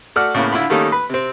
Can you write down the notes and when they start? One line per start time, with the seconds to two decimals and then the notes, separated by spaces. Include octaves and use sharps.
0.16 A3 F#4 D5 F6
0.34 A2 C#3 A#3 B3
0.52 D3 E4 F4 B5
0.70 D#3 G3 A3 A#3 C#4 D#4
0.92 B4
1.10 C3 C4